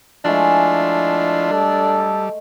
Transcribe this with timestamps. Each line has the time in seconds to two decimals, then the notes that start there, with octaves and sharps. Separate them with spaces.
0.25 F3 G#3 A3 D4 E4 F4 G#4
1.51 G3 A4